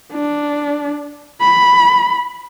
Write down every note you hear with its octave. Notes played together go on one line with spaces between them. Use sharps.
D4
B5